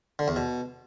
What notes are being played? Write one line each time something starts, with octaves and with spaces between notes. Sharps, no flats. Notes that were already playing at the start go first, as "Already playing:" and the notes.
D3
E2
B2